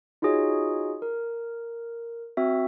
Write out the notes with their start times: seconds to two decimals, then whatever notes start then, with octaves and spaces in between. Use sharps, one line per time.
0.22 D#4 F4 F#4 G#4 C#5 D#5
1.02 A#4
2.37 C4 F#4 E5